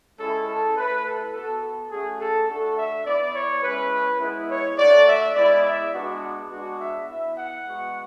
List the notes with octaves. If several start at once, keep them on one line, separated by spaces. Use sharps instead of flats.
G#3 C#4 E4 A4
A4
A3 E4 B4
A4
B3 F#4 A4
A4
A3 C#4 F#4 G#4
A4
A3 D4 F#4 A4
E5
B3 E4 D5
C#5
G#3 C#4 E4 B4
G#3 B3 E4
C#5
A3 D4 F#4 D5
E5
G#3 B3 E4 D5
E5
G#3 B3 D4 F#4
G#3 B3 D4 F#4
E5
B3 E4 E5
F#5
G#3 B3 F#4